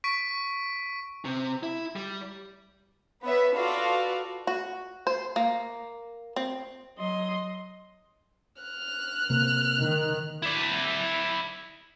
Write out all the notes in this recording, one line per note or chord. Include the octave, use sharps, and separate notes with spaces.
C#6 B6 D7
C3
E4
G3
B3 B4 C#5 E5
F4 F#4 A4 B4 D5 F5
F#4
C5
A#3
C4
F#3 D#5 C6
F6 F#6
C3 A#3
D#3
E4 D5